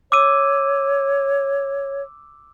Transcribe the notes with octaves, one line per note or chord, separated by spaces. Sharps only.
C#5 D6 E6 D#7